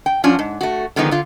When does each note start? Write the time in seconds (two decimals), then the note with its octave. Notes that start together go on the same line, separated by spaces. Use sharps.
0.06 G5
0.24 F3 F#3 C#4 D4 F4
0.39 G#2
0.61 A3 F#4
0.96 D3 D#3 F3 G#3 B3 D#4
1.11 D3 F4